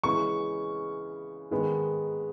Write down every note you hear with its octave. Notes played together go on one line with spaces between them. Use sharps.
C#3 E3 G#3 B3 C#6
G#2 D#3 G#3 B3